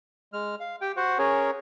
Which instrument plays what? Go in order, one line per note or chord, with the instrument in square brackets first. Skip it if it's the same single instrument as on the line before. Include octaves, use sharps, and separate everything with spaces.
[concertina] G#3 F6
F5
G4 G5
F#4 C5 F#5
C#4 G#4 A#4 C#5